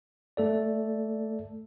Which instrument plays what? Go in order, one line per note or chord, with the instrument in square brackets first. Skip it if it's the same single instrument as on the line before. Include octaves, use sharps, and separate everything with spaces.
[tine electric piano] A3 A4 D5